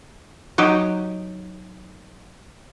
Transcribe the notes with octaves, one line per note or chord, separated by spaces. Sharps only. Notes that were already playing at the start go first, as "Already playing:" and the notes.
F#3 D#4 G4